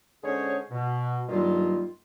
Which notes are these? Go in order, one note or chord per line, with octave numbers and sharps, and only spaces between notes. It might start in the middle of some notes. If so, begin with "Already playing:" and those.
D3 G#3 C#4 G#4 C5 C#5
B2
G2 D#3 F#3 G3 A#3 F4